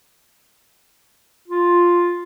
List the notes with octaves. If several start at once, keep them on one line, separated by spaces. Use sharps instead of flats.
F4